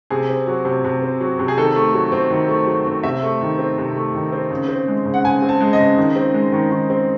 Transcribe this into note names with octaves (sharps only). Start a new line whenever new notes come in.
C3 G#4
C4
F#3
C3
C3
C4
F#3
C3
G#4
D#3 A4
A3
F#3
C4
D#3
A3
F#3
C4
C3 E5
A3
D#3
C4
C3
A3
D#3
C4
C#3
C4
G#3
C#3
F#5
C#3 G#5
C4
A5
G#3
D#5
C#3
D#3
C4
G#3
D#3
D#3
C4